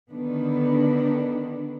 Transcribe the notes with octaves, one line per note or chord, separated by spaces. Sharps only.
D3 D#3 B3 D4